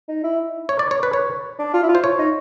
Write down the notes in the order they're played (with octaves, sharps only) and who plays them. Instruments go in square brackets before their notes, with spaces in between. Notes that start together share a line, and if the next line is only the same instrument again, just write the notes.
[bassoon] D#4
E4
[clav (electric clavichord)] C#5
D5
C#5
B4
C#5
[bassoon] D4
F4
E4
F4
[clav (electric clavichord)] C5
C#5
[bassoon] D#4